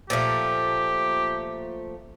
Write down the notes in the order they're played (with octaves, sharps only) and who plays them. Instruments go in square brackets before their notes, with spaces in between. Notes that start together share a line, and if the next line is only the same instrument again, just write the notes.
[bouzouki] A#2 F3 A3 [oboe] G4